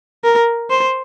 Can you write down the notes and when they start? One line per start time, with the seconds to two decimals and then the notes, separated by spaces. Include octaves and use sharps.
0.24 A#4
0.70 C5